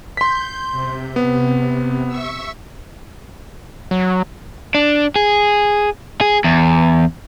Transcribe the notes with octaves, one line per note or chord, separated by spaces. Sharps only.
C6 G6 B6
C3
B3
E5 C#6 E6
F#3
D4
G#4
G#4
E2